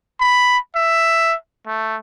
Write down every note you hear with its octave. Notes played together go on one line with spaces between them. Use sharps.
B5
E5
A3